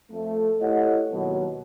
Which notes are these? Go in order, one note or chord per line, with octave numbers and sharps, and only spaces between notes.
F2 A3
A3 E4 G4 C#5 D#5 F#5
D#2 B2 F#3